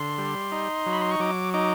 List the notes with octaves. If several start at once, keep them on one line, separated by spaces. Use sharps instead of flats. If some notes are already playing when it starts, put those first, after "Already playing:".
Already playing: D3 C6
G3
D#4
F#3
B5
C6
C#6
F#3 D6
D#4 D6